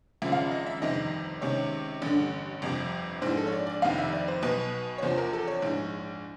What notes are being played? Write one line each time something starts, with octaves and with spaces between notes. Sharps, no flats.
G#1 F#2 C#3 F3 E5
F5
E5
D#5
E5
G1 F2 C3 D#3 D#5
C#2 C3 D#3 C#5
A1 G2 D3
G1 F2 C3
A#1 G#2 E3 C5
A4
C#5
D5
D5
F1 F2 C3 D#3 F5
E5
D5
C5
B1 B2 B4
C#5
E2 C3 F3 C5
A#4
A4
C#5
A#1 G#2 E3